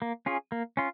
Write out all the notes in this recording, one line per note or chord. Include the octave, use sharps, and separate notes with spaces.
A#3
C#4 F4 G#4
A#3
C#4 F4